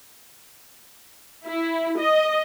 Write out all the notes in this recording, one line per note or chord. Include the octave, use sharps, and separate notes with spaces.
E4
D#5